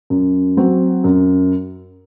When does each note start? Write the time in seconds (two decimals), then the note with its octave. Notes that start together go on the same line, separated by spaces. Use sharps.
0.10 F#2
0.57 F#3 C4 F#4
1.04 F#2